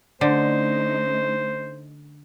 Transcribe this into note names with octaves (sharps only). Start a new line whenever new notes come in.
D3 A3 C#4 D#4 C5